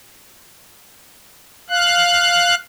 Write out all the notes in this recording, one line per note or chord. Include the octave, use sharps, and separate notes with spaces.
F5 F#6